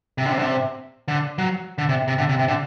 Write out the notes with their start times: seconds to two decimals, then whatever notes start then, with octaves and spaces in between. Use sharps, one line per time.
0.18 C3
0.26 D3
0.32 C3
0.39 D3
0.46 C3
1.08 D3
1.38 F#3
1.78 D3
1.89 C3
2.08 C3
2.18 D3
2.29 C3
2.39 C3
2.48 D3